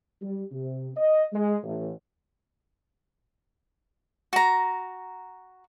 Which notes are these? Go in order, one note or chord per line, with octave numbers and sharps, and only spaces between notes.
G3
C3
D#5
G#3
A1
F#4 A#5